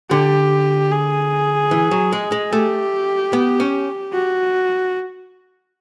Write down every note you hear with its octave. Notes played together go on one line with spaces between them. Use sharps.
D3 G4
G#4
E3
F#3
G#3
G#3
A3 G4
B3
C#4
F#4